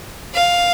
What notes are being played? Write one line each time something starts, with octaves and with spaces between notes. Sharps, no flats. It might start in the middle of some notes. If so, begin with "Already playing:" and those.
F5